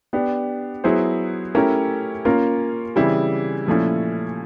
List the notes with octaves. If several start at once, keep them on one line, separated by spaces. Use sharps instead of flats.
B3 D4 G4
F#3 B3 E4 G#4 C5
A3 C#4 E4 G4 A#4
A#3 C#4 F4 A#4
C#3 E3 G3 C4 E4
A#2 F3 A3 C#4 E4